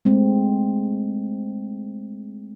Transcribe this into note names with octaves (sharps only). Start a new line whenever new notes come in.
G#3 A3 C4